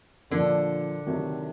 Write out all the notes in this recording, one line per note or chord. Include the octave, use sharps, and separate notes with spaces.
A#2 D3 F3 A#3 D4
C3 D#3 F#3 A3